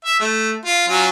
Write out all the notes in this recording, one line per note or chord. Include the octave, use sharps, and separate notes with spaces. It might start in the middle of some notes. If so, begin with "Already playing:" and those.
E5
A3
F4
F#3 C#4 F4